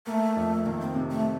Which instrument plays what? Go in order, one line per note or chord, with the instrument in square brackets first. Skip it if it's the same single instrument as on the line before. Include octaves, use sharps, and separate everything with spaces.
[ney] A3 [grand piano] A#3
[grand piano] F2
[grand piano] D#3 [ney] A#3
[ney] C4
[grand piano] C3
[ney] A3